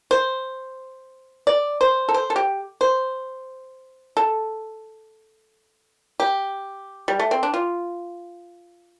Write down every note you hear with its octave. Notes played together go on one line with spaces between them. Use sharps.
C5
D5
C5
A4
C5
A4
G4
C5
A4
G4
G3
A3
C4
D4
F4